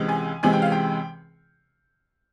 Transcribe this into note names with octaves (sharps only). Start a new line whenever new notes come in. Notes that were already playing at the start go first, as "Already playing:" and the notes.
Already playing: C#2 C3 E3 G#3
G#5
C#2 C3 E3 G#3 G#5
G5
F5
G5